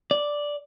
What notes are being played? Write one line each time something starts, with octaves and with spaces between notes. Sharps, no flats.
D5